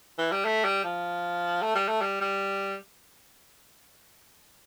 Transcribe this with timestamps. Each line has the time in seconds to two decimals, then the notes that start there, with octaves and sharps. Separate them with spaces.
0.19 E3
0.32 G3
0.45 A3
0.64 G3
0.84 F3
1.62 A3
1.75 G3
1.88 A3
2.01 G3
2.21 G3